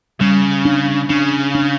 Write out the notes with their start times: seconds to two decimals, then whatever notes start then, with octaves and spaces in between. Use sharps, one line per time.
0.21 C#3 G3
0.65 D4
1.10 C#3 D4
1.55 D4